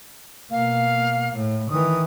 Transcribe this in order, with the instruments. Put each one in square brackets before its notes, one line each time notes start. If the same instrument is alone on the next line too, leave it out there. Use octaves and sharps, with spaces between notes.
[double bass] B2 A#3 [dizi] F5
[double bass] A2
[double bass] D#3 E3 [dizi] D#6